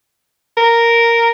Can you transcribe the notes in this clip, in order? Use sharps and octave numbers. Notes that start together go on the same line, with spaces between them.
A#4